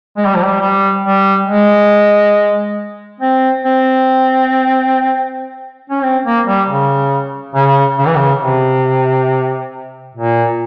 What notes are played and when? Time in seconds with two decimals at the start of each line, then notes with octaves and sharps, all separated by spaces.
0.17 G#3
0.26 G3
0.35 F3
0.44 G3
0.60 G3
1.04 G3
1.47 G#3
3.20 C4
3.64 C4
5.90 C#4
6.03 C4
6.25 A#3
6.46 G3
6.68 C#3
7.55 C#3
7.99 C#3
8.06 E3
8.16 C#3
8.41 C3
10.15 A#2